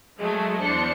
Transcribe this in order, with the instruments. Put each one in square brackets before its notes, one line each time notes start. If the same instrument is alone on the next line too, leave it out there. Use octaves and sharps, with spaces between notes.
[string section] F#3 G#3 A3
E2 D4 C5 C#7